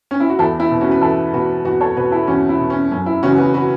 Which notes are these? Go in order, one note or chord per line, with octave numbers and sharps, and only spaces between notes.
C#4
E4
F#4
E2 E4 A4
E4
B2
C#4 F#4
B4
E2 E4 A4
B2 F#4 B4
E2 F#4 B4
A4 C#5
B2 F#4 B4
E4 A4
E2 C#4 F#4
E4
B2
C#4
F#2 C#4
E4
C#3 E3 C#4 F#4
F#4 B4
F#4 B4